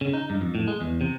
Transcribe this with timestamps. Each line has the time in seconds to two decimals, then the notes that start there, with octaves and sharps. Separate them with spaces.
0.01 C#3
0.14 D#4
0.30 G2
0.41 F2
0.55 A2
0.68 G#3
0.81 E2
1.01 C3